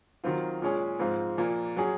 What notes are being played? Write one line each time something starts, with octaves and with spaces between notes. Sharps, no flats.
D#3 F#3 C4 F4
A#2 G#3 C#4 G#4
G#2 F3 C4 F4
A#2 F3 A#3
F#3 C#4 G#4